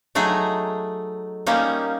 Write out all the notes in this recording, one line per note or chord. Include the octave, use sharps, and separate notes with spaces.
F#3 A3 D#4 G#4
G3 A#3 C#4 D#4